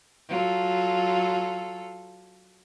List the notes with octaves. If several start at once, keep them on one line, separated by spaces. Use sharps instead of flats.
F#3 F4 A4